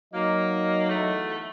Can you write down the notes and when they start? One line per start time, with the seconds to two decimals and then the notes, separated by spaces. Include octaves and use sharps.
0.14 F#3 A#3 D#4 D#5
0.89 E2 A3